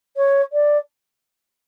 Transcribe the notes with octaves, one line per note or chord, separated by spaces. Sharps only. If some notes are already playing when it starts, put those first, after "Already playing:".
C#5
D5